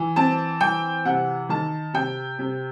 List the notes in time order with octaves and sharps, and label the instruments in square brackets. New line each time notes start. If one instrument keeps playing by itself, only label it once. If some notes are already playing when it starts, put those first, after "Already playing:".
Already playing: [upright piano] E3
C4 A5
E3 G5
C3 F#5
D#3 A5
C3 G5
C3